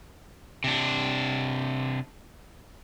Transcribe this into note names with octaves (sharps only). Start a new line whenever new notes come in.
C3 D4